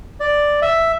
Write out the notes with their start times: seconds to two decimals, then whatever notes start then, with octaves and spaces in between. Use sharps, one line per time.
0.20 D5
0.62 E5